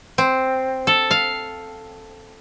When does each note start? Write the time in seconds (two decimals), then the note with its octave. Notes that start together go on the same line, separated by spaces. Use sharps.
0.18 C4
0.87 A4
1.11 F5